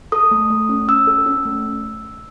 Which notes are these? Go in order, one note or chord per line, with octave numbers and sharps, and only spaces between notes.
A4 D#6
A3
A3
C#4
C#4 E6
A4
C#4
A3